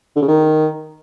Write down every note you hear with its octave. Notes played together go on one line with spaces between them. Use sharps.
D3
C#3
D#3